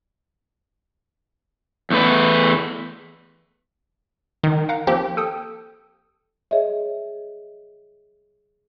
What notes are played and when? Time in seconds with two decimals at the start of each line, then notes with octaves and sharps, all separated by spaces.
1.90 E2 A3 B4
4.43 D#3
4.69 F5 F#5 A#5
4.87 F3 A#3 C4 G4
5.17 A4 G5 D#6
6.51 G#4 C#5 D#5 E5